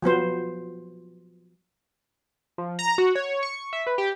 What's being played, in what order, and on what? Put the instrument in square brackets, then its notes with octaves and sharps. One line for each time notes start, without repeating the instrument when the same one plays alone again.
[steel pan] F3 F#3 B3 C5
[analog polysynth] F3
A#5
F#4
C#5
C#6
E5
B4
G4